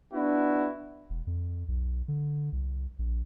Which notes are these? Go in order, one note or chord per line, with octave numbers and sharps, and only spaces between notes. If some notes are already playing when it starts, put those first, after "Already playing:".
B3 D4 E4 F#4
E1
F2
B1
D3
C2
A#1